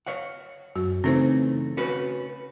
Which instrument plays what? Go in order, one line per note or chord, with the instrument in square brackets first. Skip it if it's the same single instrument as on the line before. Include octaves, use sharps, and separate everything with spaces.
[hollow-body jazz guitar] C#5 F5 F#5
[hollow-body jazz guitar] F#2 [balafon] F#4
[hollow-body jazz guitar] C#3 E3 A3 [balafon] C4 D#4 C5
[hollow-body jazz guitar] C#4 F#4 B4